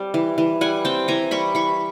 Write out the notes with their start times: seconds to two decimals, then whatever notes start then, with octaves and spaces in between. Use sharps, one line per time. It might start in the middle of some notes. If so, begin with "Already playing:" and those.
Already playing: G3 C4
0.14 E3
0.38 E3
0.61 G3 F#5 G#5
0.85 C4 G5 A5
1.08 E3 G#5 A#5
1.31 G3 B5 C#6
1.55 E3 B5 C#6